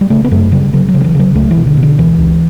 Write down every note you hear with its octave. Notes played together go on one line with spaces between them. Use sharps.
G3
C#3 A3
B3
F#2 A3
C#3 G3
C#3 F#3
F#3
C#3
F#3
E3
C#3 F#3
C#2 A3
E3
B2
D3
B2
D3
C#2 E3
C#2